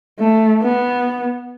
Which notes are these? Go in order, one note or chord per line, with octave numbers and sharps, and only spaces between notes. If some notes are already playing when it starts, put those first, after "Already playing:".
A3
B3